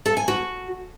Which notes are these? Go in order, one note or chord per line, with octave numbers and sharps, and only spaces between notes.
A4
G#5
F#4